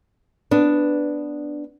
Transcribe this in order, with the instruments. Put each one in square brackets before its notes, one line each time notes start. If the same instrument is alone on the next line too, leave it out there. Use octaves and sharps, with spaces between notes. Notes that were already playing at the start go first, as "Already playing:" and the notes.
[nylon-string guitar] B3 D4